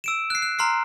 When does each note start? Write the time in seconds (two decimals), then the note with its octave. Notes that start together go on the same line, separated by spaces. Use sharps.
0.04 E6 D7 E7
0.30 F#6 C7
0.42 F#6
0.59 A#5 C6 F6 C7